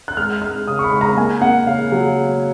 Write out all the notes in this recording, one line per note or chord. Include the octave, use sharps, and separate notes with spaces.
F#6
G#3 F6
G#3 F6
C#3 D#6
C#6
B5
G#3
A#5
A#3 G#5
A#3 F#5
C#3 F5
F#3